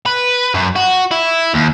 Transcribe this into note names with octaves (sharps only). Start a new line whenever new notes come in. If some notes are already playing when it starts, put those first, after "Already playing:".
B4
F#2
F#4
E4
D#2